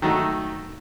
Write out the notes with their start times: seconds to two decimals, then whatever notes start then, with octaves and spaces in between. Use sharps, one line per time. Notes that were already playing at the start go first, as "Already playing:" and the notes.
0.02 D#3 F#3 A3 D#4